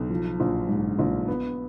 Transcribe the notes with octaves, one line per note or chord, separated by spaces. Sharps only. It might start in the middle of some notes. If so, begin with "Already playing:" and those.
Already playing: B1
F3
A#1
G#2
A#1
B3